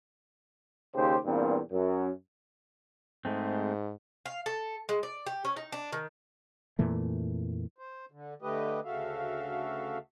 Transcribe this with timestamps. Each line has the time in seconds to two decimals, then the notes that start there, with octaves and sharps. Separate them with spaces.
0.95 D#2 C#3 G4 C5
1.25 E2 G2 A#2 A#3 C4
1.71 F#2
3.25 G#2 G#3 A3 C4
4.26 F5
4.46 A4
4.89 G#3
5.03 D5
5.26 G4
5.45 C#4
5.56 D#4
5.72 D4
5.92 D#3
6.79 F2 A#2 E3 A3
7.78 C5
8.11 D3
8.42 D3 A3 G4 B4 D#5
8.85 D2 C#3 F#4 A4 E5 F5